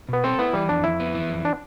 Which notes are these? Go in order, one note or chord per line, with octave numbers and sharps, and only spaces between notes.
B2 B3
C4 A4
B3 E4
E3 G3
F2 D4
F2 E4
B3
E3
F2
D4